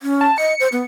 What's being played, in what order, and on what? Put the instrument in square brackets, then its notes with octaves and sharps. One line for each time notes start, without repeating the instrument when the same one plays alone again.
[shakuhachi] C#4
[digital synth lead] A5
[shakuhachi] D#5 [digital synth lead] C#7
[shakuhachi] C5
B3